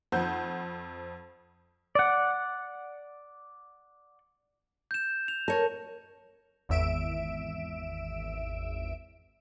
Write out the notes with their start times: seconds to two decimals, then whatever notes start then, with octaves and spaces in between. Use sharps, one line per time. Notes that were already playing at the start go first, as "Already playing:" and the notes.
0.12 F2 C5 F#5 G6
1.95 D5 F#5
4.91 G6 E7
5.28 F7
5.48 A#4 C#5 A5
6.69 G#1 E2 E5 D7 E7